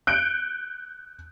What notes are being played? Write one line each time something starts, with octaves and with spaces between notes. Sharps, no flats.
F#6 G6 C#7 D7